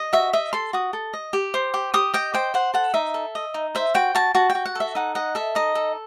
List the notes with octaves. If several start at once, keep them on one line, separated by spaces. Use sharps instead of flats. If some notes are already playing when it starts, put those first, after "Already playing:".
Already playing: D#5
F#4 E5
D#5 E5
A4 C6
F#4 D#6
A4
D#5
G4
C5
G4
G4 D#6
D#5 G5
C5 G5
C5 F#5
A4 F#5
D#4 E5
A4
D#5
D#4
C5 E5
F#4 G5
F#4 A5
F#4 A5
G5
F#4
F#5
A4 E5
D#4 F#5
D#5 F#5
A4 E5
D#4 D#5
A4